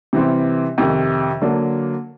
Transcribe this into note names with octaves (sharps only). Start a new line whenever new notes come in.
C3 E3 G3 C4
F2 C3 D#3
D3 F#3 A#3 D4